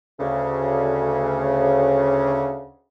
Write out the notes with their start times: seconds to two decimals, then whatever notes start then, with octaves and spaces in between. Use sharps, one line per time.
0.18 D2 C#3